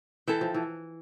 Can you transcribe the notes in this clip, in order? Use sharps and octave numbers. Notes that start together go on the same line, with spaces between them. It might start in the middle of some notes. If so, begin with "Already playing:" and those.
E3 A4 E5 G5
F3
E3